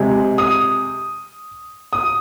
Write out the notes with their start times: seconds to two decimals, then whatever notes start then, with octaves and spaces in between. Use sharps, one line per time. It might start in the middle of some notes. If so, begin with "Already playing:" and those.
Already playing: C3 G#3
0.38 D#6
1.93 D#6